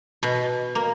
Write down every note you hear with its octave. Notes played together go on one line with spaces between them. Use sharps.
B2
A#3